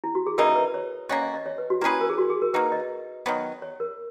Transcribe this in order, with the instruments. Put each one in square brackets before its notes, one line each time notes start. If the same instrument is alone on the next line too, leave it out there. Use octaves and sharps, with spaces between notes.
[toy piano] E4
F#4
G#4
[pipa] C#3 E3 A#3 D#4 [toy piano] A#4
[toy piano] B4
C#5
[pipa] A#3 C#4 F#4 [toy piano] D#5
[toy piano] D#5
D#5
C#5
B4
F#4
[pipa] A#3 C#4 G#4 B4 [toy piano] E4
[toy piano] A#4
G#4
F#4
G#4
A#4
[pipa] A#3 D#4 F#4 [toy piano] B4
[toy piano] D#5
[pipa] D#3 F#3 B3
[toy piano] C#5
A#4